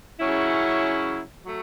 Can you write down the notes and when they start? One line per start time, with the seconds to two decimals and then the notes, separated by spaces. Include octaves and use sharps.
0.20 C#3 F#3 C#4 E4
1.46 F#3 A3 F#4